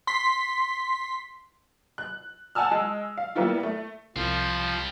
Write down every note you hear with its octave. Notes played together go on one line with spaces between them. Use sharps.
C6 B6
F#6
F#5 G#5 A5 E6 F6
G#3
F5
G3 A#3 B3 E4 F4
A3
C2 F3 G3 C4